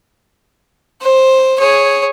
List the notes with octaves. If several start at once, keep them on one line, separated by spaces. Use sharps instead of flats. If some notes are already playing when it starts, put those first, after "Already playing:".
C5
G#4 C#5